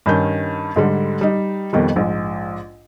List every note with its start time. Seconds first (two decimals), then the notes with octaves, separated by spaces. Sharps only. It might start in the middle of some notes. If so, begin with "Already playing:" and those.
0.06 G2 D#3 C#4 G6
0.76 G#2 D3 G3
1.21 G3 D#4
1.73 F2 B2 D#3 G3
1.96 A#1 G#2